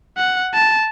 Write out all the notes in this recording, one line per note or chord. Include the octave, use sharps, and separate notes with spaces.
F#5
A5